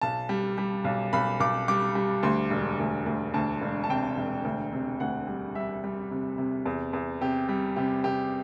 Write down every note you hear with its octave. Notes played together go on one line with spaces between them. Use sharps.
B1 A5
G3
G3
B1
B1 B5
B1 D6
G3 D6
G3
D2 C6
E1
D2
D2
D2 A5
E1
A5
C3 G5
E1
D2
C3
D2 F#5
G3
G3 E5
G3
C3
C3
E2
E2
C3 G4
G3
C3 G4
C3 G4